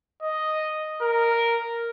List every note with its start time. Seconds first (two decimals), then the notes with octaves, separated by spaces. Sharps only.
0.22 D#5
1.02 A#4